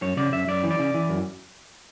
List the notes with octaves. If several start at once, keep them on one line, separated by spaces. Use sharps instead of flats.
F#2 C#5
C#3 D5
F#2 E5
F#2 D5
E3
D5
C#3
E3
F#2